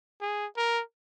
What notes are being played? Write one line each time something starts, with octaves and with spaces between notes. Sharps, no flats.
G#4
A#4